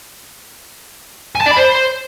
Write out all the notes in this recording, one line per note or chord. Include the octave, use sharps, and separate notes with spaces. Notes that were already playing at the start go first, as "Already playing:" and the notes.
G#5
A5
D5
B5
C5